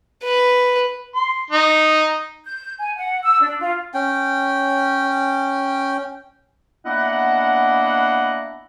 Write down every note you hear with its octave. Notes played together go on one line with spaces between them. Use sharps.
B4
C6
D#4
G6
G#5
F#5
E6
D4
F4
C#4 G5
A#3 B3 D4 E4 D#5 F#5